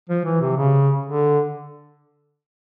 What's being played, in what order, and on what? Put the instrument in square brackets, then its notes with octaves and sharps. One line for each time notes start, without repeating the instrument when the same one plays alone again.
[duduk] F3
E3
C3
C#3
D3